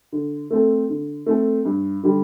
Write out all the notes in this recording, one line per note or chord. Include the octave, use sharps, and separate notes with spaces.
D3
A3 C4 A4
D3
A3 C4 A4
G2
D3 G3